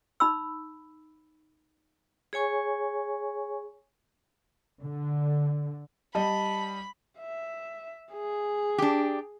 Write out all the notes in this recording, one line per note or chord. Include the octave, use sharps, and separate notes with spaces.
D#4 B5 E6
G#4 C#5 G#5 C#6
D3
G3 D#5 A5 B5
E5
G#4
D4 G4